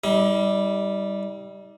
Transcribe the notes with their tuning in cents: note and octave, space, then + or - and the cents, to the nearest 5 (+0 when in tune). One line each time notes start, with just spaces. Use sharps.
G3 +0 D#4 +40